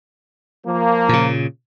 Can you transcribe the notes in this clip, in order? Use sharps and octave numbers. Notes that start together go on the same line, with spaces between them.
F3 A#3
A#2 C#3